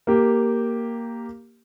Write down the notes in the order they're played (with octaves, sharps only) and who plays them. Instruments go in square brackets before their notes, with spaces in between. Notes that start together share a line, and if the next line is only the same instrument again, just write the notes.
[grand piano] A#3 G4